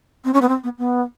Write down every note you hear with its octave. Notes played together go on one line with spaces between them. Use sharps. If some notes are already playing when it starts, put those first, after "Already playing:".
C4
C#4
B3
C4
B3
B3